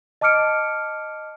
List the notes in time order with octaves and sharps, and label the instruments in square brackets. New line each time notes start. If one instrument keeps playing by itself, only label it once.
[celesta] D#5 A5 D6 F6 C#7 D7